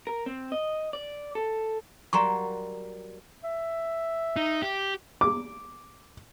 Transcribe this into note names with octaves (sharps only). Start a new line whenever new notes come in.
A#4
C4
D#5
D5
A4
F#3 G3 A#3 A#5 C6 C#6
E5
D#4
G4
D6